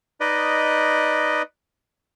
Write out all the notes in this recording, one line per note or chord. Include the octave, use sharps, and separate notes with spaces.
D#4 B4 D5 D#5